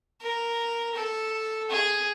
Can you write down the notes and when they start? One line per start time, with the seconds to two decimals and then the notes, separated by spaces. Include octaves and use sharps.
0.22 A#4
0.95 A4
1.70 G#4